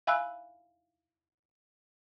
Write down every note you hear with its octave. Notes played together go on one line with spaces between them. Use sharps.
E5 F5 G#5 B5 E6 F#6